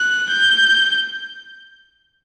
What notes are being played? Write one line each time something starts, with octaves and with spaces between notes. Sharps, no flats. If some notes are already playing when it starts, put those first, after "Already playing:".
Already playing: F#6
G6